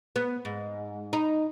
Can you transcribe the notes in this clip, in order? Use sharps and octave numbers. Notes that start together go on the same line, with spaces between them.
B3
G#2
D#4